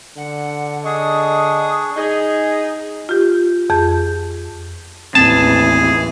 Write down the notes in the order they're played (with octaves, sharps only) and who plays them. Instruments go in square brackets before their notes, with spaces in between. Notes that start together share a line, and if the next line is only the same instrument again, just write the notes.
[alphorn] D3 [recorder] F#5
[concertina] D4 G#4 C#6 [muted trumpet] D#5 [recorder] D#6
[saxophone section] D#4 G#4
[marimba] F4 G4
F2 G#4 G6
[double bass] A1 E3 [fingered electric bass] D#2 A#3 C4 [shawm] G#4 [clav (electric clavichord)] A5